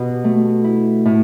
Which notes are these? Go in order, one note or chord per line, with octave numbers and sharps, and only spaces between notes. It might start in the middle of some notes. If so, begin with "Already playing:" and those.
Already playing: B2 G4
A3
E4
A2